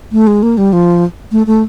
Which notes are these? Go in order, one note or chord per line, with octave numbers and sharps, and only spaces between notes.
A3
G#3
A#3
G3
F3
A3
A3